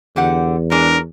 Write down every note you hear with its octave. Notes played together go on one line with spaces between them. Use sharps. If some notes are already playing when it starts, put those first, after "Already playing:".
E2 D3 G4 F#5
F#3 G#3 D4 A#4